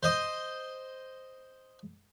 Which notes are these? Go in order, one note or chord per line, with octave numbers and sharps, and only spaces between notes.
C5 D#5 D#6